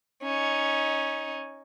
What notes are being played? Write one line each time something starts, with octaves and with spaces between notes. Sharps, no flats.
C#4 D#4